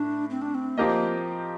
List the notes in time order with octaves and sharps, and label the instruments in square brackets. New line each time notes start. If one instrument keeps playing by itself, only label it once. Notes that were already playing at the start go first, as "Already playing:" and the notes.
Already playing: [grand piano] A2 [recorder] D4
[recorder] C4
D4
C4
[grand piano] F3 C4 G4 A#4 D#5 [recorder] A#3